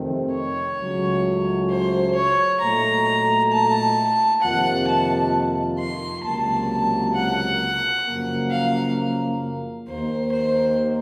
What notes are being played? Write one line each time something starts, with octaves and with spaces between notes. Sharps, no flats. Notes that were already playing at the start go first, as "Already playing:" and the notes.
Already playing: F2 C3 D#3 A3 C4
C#5
C#2 C#3 F#3 A3 C#4
C5
C#5
A#2 F#3 A3 D#4 A#5
A5
F2 C3 D#3 A#3 F4 F#5
A5
C6
C#2 C3 F#3 A#3 A5
F#5
F#2 C#3 F3 A#3
F5
D#2 D#3 A#3 C5
C5